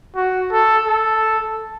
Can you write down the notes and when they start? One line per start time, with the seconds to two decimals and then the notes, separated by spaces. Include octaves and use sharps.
0.16 F#4
0.52 A4
0.87 A4